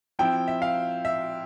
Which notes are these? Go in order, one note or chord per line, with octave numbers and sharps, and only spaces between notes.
F3 C4 E4 G5
E5
F5
E5